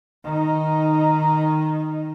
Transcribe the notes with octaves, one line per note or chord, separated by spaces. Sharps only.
D#3 D#4